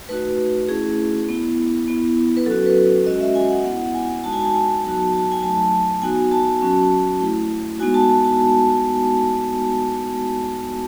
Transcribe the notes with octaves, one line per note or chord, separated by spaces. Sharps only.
A3 D#4 F#4 B4
A3 C#4 E4 G#4
B3 E4
B3 E4
B4
F#3 C#4 F#4 A4
B4
G#3 C#4 F#4 D#5
E5
G#5
F#5
B3 E4 F#5
G#5
G#3 D#4 F#4 A5
G#5
A5
G#5
F#3 B3 D#4 F#4 A5
A5
G#5
F#3 A3 D#4 A5
B3 D#4 F#4 G#5
A5
F#3 C#4 F#4
A3 E4
G#3 B3 D#4 F#4 G#5
A5
A5
A5